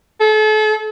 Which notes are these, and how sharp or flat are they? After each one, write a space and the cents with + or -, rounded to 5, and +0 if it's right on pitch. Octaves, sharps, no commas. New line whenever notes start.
A4 -40